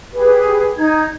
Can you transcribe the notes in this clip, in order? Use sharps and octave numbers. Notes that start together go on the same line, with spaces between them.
G4 G#4 B4
D#4 G#6